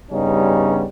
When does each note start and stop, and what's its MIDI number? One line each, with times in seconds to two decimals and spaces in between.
0.11 0.85 43
0.11 0.85 49
0.11 0.85 55
0.11 0.85 59
0.11 0.85 61
0.11 0.85 63